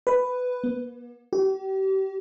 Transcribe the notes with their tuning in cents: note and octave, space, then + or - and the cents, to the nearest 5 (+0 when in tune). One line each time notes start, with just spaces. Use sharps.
B4 +10
B3 -45
G4 -35